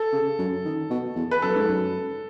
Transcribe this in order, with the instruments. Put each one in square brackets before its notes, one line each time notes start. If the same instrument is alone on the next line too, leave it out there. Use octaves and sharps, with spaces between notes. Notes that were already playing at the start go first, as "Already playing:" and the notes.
Already playing: [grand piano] A4
[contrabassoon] C#3
F#2
D#3
B2
E2
[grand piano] B4
[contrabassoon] F#2 [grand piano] A4
[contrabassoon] G#2
F#2